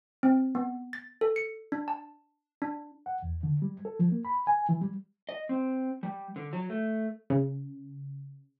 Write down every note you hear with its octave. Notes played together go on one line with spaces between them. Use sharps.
C4
B3
A6
A4
C#7
D4
A5
D4
F#5
E2
D3
G3
A4
F3
A#3
B5
G#5
E3
G3
D#5
C4
G3
D3
F#3
A3
C#3